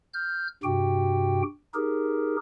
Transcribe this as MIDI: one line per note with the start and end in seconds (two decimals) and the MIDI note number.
0.14 0.47 89
0.14 0.47 91
0.63 1.42 43
0.63 1.42 48
0.63 1.42 66
0.63 1.42 67
0.63 1.42 79
1.74 2.36 63
1.74 2.36 67
1.74 2.36 68
1.74 2.36 70